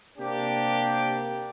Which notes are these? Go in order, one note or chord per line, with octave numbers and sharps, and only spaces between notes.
C3 A#3 D4 G4